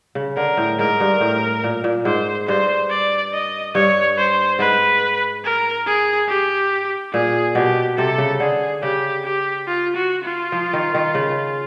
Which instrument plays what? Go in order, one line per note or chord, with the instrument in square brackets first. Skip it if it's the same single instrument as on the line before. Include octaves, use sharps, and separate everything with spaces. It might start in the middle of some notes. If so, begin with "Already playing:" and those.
[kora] C#3
[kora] D3 [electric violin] A#4
[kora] A2
[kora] G#2 [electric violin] A#4
[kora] G2
A2
A#2
A#2
[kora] G#2 [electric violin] C5
[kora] G2 [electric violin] C5
[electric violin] D5
D#5
[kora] G2 [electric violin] C#5
[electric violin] C5
[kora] G#2 [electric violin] B4
[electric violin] A#4
G#4
G4
[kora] A#2 [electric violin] G#4
[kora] B2 [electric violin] G4
[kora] C3 [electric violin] A4
[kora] C#3
[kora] D3 [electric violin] G#4
[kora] C#3 [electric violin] G4
[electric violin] G4
F4
F#4
F4
[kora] F3
D#3
D#3
C#3